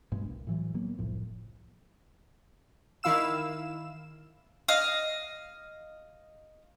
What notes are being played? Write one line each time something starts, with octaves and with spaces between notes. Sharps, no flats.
G2 B2 G#3
C2
A2 E3 F#3
D#3 F#3 A#3 B3
F#1 C2 A2 F3
D#3 E4 F5 E6 E7
D#5 F5